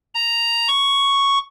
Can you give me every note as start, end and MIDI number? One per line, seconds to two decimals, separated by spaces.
0.15 0.68 82
0.68 1.38 85